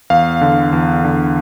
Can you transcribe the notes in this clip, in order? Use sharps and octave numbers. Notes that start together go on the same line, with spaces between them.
E2 F5
D3
E2
D3